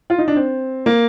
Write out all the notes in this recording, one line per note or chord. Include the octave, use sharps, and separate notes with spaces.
F4
D#4
D4
C4
A#3